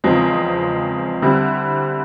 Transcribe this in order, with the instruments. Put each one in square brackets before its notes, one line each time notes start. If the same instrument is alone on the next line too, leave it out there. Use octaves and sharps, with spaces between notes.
[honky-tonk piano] E2 C#3 F3 G#3 C4
D3 G3 C4 E4